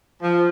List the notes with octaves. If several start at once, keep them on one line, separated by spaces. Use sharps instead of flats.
F3